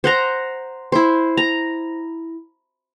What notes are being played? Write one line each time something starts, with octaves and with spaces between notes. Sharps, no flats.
C5 F#5 A#5
E4 C5
A#5